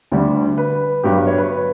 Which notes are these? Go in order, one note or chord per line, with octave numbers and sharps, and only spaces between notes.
D2 D3 G3
B4
G1 G2 F#3 G4
B4
C#5
B4